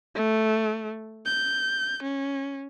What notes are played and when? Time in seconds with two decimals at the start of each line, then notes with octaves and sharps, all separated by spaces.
0.15 A3
1.26 G6
2.04 C#4